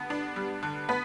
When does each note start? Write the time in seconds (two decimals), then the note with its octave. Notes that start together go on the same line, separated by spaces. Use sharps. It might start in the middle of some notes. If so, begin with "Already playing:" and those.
Already playing: D3 B3
0.10 D4
0.36 G3
0.63 D3
0.89 B3 B4